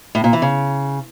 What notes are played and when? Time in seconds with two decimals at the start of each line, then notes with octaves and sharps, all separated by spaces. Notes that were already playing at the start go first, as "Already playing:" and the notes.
0.15 A2
0.24 A#2
0.33 E3
0.42 C#3